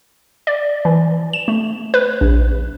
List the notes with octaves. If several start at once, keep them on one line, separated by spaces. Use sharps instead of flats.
D5
E3
E7
A3
B4
A#1